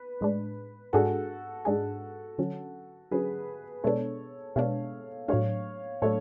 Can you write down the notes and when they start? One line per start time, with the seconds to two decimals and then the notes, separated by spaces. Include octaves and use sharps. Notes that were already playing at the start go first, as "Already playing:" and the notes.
Already playing: B4
0.21 A2 G#3 D4
0.93 G#2 G#3 D4 F#4 G#4 A4
1.65 G#2 G#3 D4 G#4
2.38 D3 F#3 C#4
3.11 D3 F#3 C#4 G#4 B4
3.84 B2 G#3 B3 D4 A4 C#5
4.56 B2 G#3 B3 D4 C#5 F5
5.28 A2 F#3 A3 D4 C#5 F5
6.02 A2 F#3 A3 D4 A4 C#5